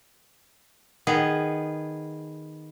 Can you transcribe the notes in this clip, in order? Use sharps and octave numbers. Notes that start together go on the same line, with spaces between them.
D#3 B3 G#4